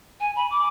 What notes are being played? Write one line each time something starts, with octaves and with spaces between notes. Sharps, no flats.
G#5
B5
D6